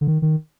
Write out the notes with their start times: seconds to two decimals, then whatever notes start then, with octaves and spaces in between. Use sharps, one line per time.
0.01 D3
0.07 D#3
0.22 D#3